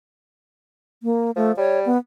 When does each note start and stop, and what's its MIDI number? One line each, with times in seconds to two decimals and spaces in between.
1.03 1.31 58
1.36 1.52 53
1.36 1.52 57
1.57 1.88 55
1.57 1.79 73
1.86 1.97 59